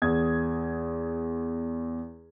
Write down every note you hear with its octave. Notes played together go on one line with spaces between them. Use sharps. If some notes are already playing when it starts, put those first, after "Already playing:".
E2 D#6 G#6